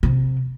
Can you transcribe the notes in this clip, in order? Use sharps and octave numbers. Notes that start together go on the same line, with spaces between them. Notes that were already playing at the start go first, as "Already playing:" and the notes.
C3